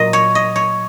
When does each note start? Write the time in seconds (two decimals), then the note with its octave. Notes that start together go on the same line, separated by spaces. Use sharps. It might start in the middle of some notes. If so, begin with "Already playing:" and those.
Already playing: A#2 F#3 D#5
0.13 C#5
0.35 D#5
0.56 C#5